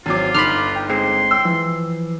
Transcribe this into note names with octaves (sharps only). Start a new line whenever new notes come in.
G#1 F#3 F4 D6
G1 D#4 B5 C6 D6 F6
G5
G#3 C4 C6
G5 E6
E3 F3